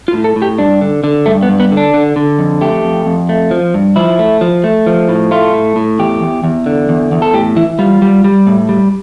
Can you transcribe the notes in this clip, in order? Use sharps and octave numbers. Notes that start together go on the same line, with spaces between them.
F4
A2
A4
A2
G4
G2 D4
D3
D3
G2 A3
B3
G2
B3
D3
D4
D3
D3
F2
A3 G4
F2
F2
A3
F3
G2
F3 E4
A3
F3
A3
F3
A2
A3 F4
A2
A2
E2 G4
E2
E2
D3
E2
E2
A4
A2 G4
E3 E4
G3 F4
G3
G3
A2
G3